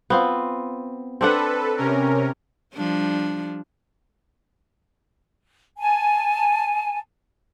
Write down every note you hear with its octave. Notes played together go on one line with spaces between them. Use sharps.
B3 C4 F4
C4 D4 A4 B4 F#5
C3 C#4 A#4
F3 G3 D4
G#5 A5